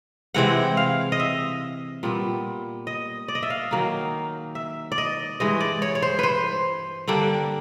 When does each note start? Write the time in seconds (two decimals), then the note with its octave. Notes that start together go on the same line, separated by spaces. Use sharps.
0.34 C3 E3 G#3 C4 F#5
0.77 F5
1.12 D#5
1.20 E5
2.03 A#2 G3 B3
2.87 D#5
3.28 D5
3.35 D#5
3.43 E5
3.50 F5
3.71 D#3 F#3 A#3 D#4
4.55 E5
4.92 D5
4.98 D#5
5.40 G2 E3 G#3 D#5
5.61 D5
5.82 C#5
5.95 C#5
6.02 C5
6.19 B4 C5
7.08 D3 G3 A#3 D4